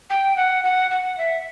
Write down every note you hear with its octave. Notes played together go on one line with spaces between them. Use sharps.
G5
F#5
F#5
F#5
E5